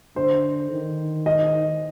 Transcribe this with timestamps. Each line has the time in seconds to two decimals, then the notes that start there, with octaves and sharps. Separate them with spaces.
0.16 D3 C5
0.71 D#3
1.26 D#5